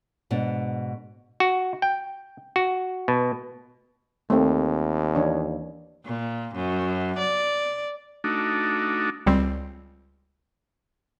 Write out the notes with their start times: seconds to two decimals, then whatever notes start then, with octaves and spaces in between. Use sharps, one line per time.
0.31 G#2 B2 D4
1.40 F#4
1.82 G5
2.56 F#4
3.08 B2
4.30 D#2 A3 C4
5.15 E3 D4 C#5
6.06 A#2
6.55 F#2
7.19 D5
8.24 A3 D4 D#4 F#4
9.27 C#2 G3 C4